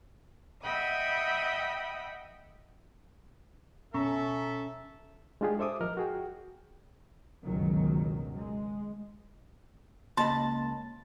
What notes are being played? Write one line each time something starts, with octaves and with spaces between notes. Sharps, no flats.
D#5 E5 F#5 G5 B5 D#6
B2 C#4 A4 E5 A#5 C#6
G#3 D4 F4 G4 G#4
A4 C5 E5 D6 D#6
F3 A#4 D#5 F6
F#4 G#4 G5
G1 C#2 F#2 B2 D#3 F#3
G#3
C#2 A#3 D#5 A5 B5 C6